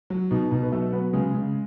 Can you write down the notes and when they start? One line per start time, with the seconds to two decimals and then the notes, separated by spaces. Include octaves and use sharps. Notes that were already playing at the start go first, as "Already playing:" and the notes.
0.10 F#3
0.31 B2 D#4
0.51 B2 D#4
0.63 B4
0.72 F#3 A3 A4
0.92 F#3 B3 B4
1.13 C#3 G#3 G#4
1.35 C#3